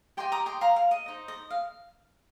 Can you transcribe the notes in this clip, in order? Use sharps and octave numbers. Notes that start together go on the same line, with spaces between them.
G4 D#5 G5 C6
A#5 D#6
G5 C6
F5 A#5
F5
D#5
D#4 C5 D#5
D#5
F5